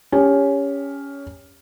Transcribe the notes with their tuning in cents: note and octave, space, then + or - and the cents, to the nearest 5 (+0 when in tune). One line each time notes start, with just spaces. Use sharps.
C#4 +15 G4 +35